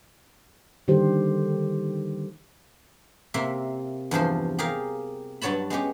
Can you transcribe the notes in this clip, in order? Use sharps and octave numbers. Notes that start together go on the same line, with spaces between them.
D3 D#3 G3 G4 C5
C3 A#3 C4 E5
E2 G2 F3 C5
G4 G#4 A#4 F5
G2 F#3 C#5 A5 B5
G#3 B3 C#4 G4